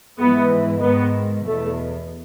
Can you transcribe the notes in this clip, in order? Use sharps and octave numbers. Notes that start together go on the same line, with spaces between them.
G#2 E3 B3
G#2 D#3 B3
E2 B2 A3